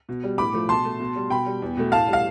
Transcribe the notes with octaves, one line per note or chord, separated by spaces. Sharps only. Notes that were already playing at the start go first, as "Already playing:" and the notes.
B2
G3
A2 B5 D6
F3 A3
B2 A5 C6
A3
B2
G3
B2 G5 B5
G3
E2
B2 A3
A2 F5 A5
G3
F5